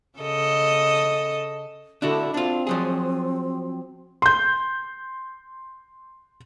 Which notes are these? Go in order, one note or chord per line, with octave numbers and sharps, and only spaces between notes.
C#3 A4 D#5
D3 D4 E4 F#4
C4 D4 F4
F3 F#3 G#4
C6 G6